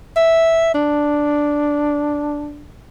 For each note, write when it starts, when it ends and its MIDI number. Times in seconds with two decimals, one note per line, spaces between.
0.17 0.74 76
0.74 2.65 62